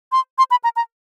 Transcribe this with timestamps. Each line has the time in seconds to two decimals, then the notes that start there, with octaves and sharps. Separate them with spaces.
0.12 C6
0.38 C6
0.51 B5
0.64 A#5
0.76 A#5